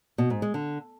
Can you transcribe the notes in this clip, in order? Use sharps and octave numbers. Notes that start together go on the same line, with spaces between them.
B2
G#2
G#3
D3